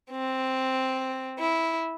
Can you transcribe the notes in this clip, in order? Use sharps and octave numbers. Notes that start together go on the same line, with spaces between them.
C4
E4